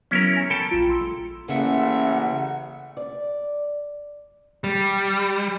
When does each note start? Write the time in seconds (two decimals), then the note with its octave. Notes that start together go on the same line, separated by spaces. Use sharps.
0.11 F#3 B3 C#4 E4 A#4
0.36 G#5 C#7
0.50 A4 G5 A5 B5
0.69 A#1 F4 A#5
0.89 C6 E6
1.49 A1 C#3 A#3 E5 F#5
2.97 D5
4.64 G3